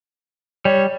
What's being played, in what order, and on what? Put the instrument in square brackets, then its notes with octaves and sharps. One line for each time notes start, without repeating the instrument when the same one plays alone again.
[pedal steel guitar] G3 [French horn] C#5